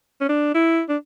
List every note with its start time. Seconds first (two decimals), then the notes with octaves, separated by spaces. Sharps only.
0.21 C#4
0.29 D4
0.54 E4
0.89 D4